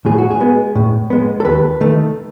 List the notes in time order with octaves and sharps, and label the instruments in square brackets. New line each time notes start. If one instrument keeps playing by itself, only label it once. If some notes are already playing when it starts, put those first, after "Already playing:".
[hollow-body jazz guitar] A2 G#4
F#4
G#4
G#3 B3
A2
G#3 B3
A4
D#2 B4
D#3 A3